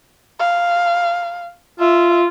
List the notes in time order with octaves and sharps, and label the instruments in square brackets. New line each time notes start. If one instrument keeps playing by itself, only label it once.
[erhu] F5
[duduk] F4 [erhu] E5